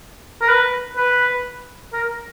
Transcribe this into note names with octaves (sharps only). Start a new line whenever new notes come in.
A#4
B4
B4
A#4